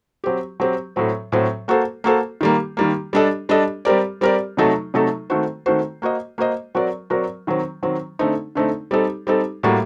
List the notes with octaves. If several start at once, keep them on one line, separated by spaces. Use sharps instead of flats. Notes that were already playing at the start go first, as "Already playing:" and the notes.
F#3 C4 G4
F#3 C4 G4
A2 F#3 C4
A2 F#3 C4
A#3 F#4 A4 C5
A#3 F#4 A4 C5
D#3 G3 A#3
D#3 G3 A#3
G3 D4 A4 D#5
G3 D4 A4 D#5
G3 C4 G4 A#4 D5
G3 C4 G4 A#4 D5
C3 F#3 A3 D#4 A4
C3 F#3 A3 D#4 A4
D#3 A3 C4 F#4 C5
D#3 A3 C4 F#4 C5
A#3 F#4 C5 D#5
A#3 F#4 C5 D#5
F#3 C4 F#4 A#4 D5
F#3 C4 F#4 A#4 D5
D#3 F#3 C4
D#3 F#3 C4
D3 A3 C4 D#4
D3 A3 C4 D#4
G3 C4 D#4 A4
G3 C4 D#4 A4
A2 G3 A#3 F#4